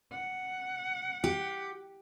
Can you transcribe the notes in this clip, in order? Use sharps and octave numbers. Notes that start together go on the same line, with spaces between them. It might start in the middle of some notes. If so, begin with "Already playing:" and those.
F#5
G4